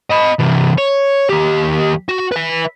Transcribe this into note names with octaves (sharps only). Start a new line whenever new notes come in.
D#5 B5
C3 E3
C#5
D#2 G4
F#4
B4 E5